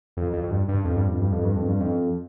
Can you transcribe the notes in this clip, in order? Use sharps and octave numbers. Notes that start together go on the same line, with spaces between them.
F2
F2
F2
G2
G2
F2
G2
F2
G2
F2
G2
F2
G2
F2